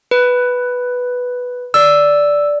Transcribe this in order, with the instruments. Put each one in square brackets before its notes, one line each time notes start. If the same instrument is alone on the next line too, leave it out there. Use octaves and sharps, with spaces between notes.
[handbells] B4
[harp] D5 [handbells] E6